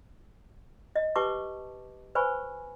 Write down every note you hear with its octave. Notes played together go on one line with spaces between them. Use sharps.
D#5
G4 B4 A5 C#6 D6
B4 C5 G#5 B5 C#6